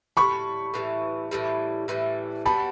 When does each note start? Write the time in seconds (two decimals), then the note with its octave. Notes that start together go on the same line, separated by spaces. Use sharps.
0.17 A2 E3 G3 B5 C#6
0.74 A2 E3 G3
1.31 A2 E3 G3
1.88 A2 E3 G3
2.46 G3 B3 D4 F#4 A5 B5